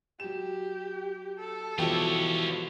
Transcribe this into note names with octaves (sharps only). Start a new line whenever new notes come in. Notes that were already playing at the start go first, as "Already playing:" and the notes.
F#3 G4 E7
A4
B2 E3 F3 G3 F4 G4 C#5 G5